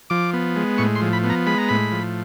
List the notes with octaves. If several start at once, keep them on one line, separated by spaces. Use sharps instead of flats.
F3 D6
B3
G#3
A2 C#6
C6
F3
B5
B3
A#5
G#3 B5
A#5
A2 B5
F3